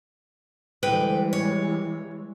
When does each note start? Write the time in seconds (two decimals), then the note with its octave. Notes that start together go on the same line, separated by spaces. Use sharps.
0.83 D2 E3 G3 G#3 B4 G5
1.33 C#5